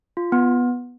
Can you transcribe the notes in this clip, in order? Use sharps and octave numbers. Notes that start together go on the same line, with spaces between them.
F4
B3